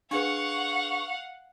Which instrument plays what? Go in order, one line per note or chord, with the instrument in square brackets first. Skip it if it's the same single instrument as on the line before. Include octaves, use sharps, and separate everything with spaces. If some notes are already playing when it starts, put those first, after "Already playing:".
[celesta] D4 G#4 B4 [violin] F5 F#5 [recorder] C#6